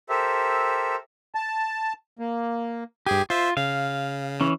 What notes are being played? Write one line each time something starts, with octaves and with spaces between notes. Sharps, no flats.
G4 A4 A#4 C5 E5
A5
A#3
G2 G4 G#4 G#5
F4 C5 E5
C#3 F5
E3 C#4